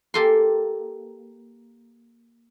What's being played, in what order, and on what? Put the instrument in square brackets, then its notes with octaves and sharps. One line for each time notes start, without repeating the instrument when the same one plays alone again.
[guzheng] A#3 G4 A4 G#5 C6